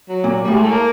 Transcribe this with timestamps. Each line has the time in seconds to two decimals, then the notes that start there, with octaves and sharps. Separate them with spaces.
0.09 F#3
0.24 A#2
0.44 G3
0.48 A2
0.54 G#3
0.62 A3
0.71 A#3